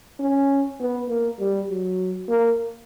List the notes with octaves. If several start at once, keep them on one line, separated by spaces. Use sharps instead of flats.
C#4
B3
A#3
G3
F#3
A#3